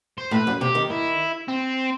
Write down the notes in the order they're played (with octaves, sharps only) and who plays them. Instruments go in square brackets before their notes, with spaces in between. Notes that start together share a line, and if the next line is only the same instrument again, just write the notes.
[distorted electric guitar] C5
[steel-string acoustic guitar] A2 [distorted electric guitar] B4
[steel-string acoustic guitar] F#2
[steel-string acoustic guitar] C3 [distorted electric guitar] G4
[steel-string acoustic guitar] D#3
[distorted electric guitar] E4
C4